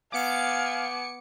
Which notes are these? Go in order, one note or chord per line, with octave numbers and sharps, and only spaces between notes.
B3 F5 G#5 D6 C#7